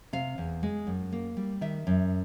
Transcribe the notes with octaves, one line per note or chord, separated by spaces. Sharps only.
C3 F5
E2
G#3
F#2
A#3
G3
D#3 E5
F#2